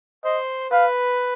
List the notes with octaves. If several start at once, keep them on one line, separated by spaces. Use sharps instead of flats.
C5 D#5
B4 F5